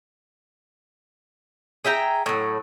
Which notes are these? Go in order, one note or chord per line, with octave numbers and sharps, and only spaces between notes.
G#4 E5 G5 A#5
A2 F#3